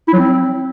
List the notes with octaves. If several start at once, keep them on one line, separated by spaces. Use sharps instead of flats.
E4
F#3
C4